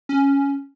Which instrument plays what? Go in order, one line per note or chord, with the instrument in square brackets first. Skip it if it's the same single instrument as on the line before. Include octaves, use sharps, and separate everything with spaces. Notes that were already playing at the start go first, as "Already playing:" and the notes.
[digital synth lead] C#4